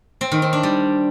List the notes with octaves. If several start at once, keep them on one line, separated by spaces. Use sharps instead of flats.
C4
D#3
C4
D4
G3